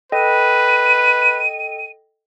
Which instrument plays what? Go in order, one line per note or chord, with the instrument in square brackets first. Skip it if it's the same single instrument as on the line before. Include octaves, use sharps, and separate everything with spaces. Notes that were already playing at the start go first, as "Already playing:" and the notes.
[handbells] A4 D#5 G5 [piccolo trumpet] B4 [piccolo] D#7